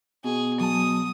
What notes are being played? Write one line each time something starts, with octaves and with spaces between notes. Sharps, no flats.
B2 G#4
F#3 A5 D#6